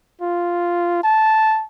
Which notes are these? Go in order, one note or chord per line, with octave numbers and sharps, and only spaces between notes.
F4
A5